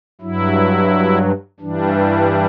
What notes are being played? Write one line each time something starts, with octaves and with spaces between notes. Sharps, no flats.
G2 F#3 E4
G2 E3 G3 D4